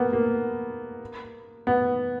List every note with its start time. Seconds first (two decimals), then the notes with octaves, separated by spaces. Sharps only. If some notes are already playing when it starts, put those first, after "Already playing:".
Already playing: A#3 B3
0.13 A#3
1.67 B3